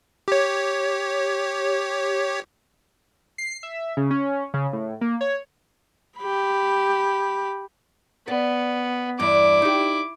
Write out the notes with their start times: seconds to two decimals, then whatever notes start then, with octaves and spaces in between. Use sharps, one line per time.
0.28 G4 C#5
3.38 C7
3.63 E5
3.97 C#3
4.10 C#4
4.54 C#3
4.73 A2
5.01 A#3
5.21 C#5
6.19 G4 B5
8.28 B3 D5
9.19 E2 G2 E4 D6
9.62 D#4 G4